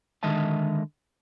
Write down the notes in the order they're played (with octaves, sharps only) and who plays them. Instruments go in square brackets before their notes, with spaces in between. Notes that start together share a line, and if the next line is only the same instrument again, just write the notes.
[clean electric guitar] D3 D#3 G#3 D#5 E5 A5